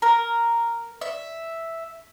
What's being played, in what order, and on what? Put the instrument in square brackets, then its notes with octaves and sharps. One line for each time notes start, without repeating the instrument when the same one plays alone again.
[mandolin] A#4
E5